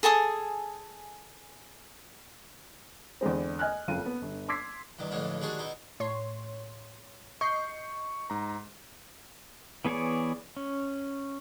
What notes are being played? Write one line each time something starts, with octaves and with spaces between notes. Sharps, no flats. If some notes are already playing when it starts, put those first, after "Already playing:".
G#4 A4 G#5 D#6
E2 D3 G#3 C4
D#5 G#5 F6 F#6
F#1 F2 F4 D#7
B3
G1
C6 D6 E6 G#6 B6 C7
E2 G2 D#3
A1 F2 A2 D3 E3 G#3
D#3 G3 G#3 D4 F#4 G#4
B2 D#4 E4
A2 C#5 C6
D#5 C#6 G6 C7
G#2 A#5
E3 B3 G#4 C#5 D5
C#4